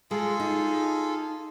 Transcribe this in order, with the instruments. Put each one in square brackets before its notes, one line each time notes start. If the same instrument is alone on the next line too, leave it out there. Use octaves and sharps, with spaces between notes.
[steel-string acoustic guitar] G#3 [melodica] F4 G#4 A4
[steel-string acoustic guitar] D#4